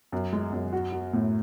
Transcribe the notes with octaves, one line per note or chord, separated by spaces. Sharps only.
F#2
G#3
F#2
F#4
F#4
A2